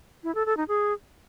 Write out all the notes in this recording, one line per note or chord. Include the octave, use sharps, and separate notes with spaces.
E4
A4
A4
D#4
G#4